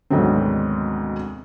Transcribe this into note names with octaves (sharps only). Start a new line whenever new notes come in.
D2 G#2 B2 D#3 F#3 C4